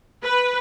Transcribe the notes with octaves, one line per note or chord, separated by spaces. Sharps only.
B4